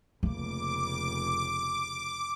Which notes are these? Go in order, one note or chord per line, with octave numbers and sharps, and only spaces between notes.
F1 C#3 A3 A#3 D6